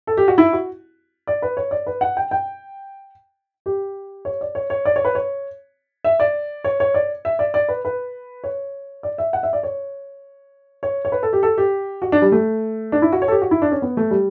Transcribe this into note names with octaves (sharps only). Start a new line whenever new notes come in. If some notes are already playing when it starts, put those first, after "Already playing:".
A4
G4
F#4
E4
F#4
D5
B4
C#5
D5
B4
F#5
G5
G5
G4
C#5
D5
C#5
C#5
D5
C#5
B4
C#5
E5
D5
C#5
C#5
D5
E5
D5
D5
B4
B4
C#5
D5
E5
F#5
E5
D5
C#5
C#5
C#5
B4
A4
G4
A4
G4
F#4
D4
G3
A3
D4
E4
F#4
C#5
A4
G4
F#4
E4
D4
C#4
B3
A3
G3